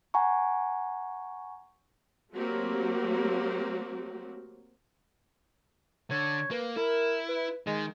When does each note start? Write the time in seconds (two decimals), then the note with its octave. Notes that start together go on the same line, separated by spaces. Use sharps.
0.14 F#5 G#5 A#5 C#6
2.33 F#3 A3 A#3 C4 F#4 G4
6.11 D3 C#5
6.51 A#3 B4
6.76 E4 A#4
7.29 B4
7.67 D#3 G#3